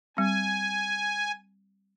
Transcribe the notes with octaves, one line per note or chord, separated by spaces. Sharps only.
G3 C4 G#5